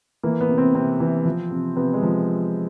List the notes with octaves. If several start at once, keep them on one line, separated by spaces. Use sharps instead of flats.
E3 A#3
B3
C3
C4
C3 C4
E3
F3
C3
C3 B3
G#3
F3